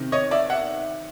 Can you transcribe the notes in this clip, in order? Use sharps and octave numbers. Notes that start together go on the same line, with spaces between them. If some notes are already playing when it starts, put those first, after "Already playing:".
Already playing: C3 D#3
C#5 D#5
D5 E5
E5 F#5